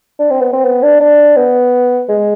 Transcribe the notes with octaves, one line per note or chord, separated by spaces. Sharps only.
D4
C4
B3
C4
B3
D4
D4
B3
G#3